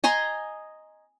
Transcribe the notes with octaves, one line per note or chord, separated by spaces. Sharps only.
D#5 G#5 A#5 C6